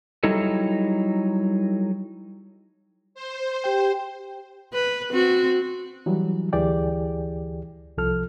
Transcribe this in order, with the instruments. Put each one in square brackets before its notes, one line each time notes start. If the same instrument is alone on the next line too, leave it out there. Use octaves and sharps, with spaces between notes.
[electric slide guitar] F#3 G3 D#4 E4 A4
[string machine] C5
[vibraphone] G4 G5
[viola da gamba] B4
C4 F#4
[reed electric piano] E3 F#3 G3
D2 E3 G4 G#4 D5 G5
C2 F3 A4 F6